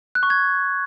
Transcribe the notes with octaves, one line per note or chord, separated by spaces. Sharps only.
F#6
C#6
G#6